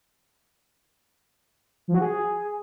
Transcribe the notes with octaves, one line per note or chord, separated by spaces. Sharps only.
F3
F#4
G#4